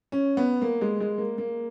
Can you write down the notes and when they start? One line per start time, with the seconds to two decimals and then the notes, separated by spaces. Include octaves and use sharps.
0.12 C#4
0.37 B3
0.62 A#3
0.81 G#3
1.00 G#3
1.18 A#3
1.38 A#3